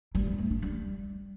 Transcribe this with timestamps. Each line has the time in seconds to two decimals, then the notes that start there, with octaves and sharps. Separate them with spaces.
0.15 G3
0.27 B3
0.38 A3
0.50 D4
0.62 G3